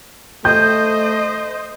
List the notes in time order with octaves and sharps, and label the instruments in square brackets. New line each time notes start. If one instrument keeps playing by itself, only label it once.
[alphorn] A3 [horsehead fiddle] C5 D#5 [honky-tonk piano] G6